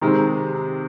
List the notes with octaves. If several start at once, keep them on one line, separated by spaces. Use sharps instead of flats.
C3 D#3 G#3 C4 D#4